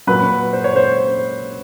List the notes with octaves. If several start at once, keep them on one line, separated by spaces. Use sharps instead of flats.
A#2 F#3 B4
C5
C#5
C5